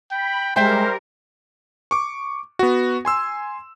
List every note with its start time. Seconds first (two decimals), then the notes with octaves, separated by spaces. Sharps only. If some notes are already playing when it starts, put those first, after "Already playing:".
0.11 G5 B5
0.56 G3 G#3 A#4 C5 E5 G5
1.91 C#6 D6
2.59 B3 F#4
3.05 G#5 C6 E6